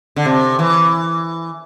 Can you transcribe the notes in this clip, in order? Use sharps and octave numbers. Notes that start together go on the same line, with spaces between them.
D3
C3
E3